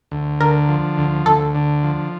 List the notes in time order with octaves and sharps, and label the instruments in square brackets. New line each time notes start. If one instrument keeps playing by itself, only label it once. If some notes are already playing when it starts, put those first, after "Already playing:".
[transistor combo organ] D2
[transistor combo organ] D3 [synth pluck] A#4
[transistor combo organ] F3
D2
[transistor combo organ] D2 [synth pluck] A4
[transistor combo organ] D3
F3